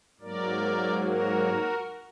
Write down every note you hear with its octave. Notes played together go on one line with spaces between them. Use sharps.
G#2 F#3 A#3 A#4 D5
F#4 A#4